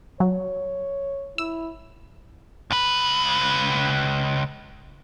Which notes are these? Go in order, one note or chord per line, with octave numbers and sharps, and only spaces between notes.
F#3 C#5
E4 E6
C#2 B4